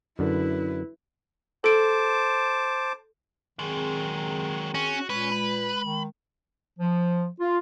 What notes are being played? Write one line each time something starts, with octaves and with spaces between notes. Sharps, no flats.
F#2 D3 E4 B4
A4 C5 A5 D6 D7
D#3 F#3 G#3 C4 G#4 C6
C#4 F#4
A#2 G#3 C#4 B4
B5
D#3
F3
F4